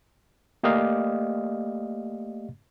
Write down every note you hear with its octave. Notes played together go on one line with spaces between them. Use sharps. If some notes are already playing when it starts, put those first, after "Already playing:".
A3 A#3 G4 D5 D#5 F5